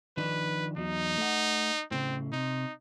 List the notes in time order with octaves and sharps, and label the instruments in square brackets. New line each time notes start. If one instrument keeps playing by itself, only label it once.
[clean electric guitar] D#3 F3 D4 [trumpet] B4
[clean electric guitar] E2 F#3 [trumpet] D#4
[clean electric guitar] A3 F#5
[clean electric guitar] A2 C#3 [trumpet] C4
[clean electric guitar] C3 [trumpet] D#4